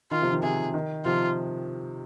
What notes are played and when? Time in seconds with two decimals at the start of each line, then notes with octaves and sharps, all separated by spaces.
0.11 D#3 F4
0.22 C3 F3
0.32 D#3
0.43 C3 G#4
0.74 D#3
1.05 C3 F3 F4